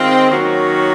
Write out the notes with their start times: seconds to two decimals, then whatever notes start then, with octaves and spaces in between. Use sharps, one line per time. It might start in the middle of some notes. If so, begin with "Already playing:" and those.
Already playing: D#3 G#3 C4 F4
0.30 D#3 F#3 A#3 C#4 F#4